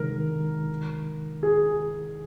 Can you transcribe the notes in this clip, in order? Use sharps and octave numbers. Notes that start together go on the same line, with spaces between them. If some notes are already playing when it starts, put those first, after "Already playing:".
Already playing: C3 D#3 G#3 D#4 A#4
G#4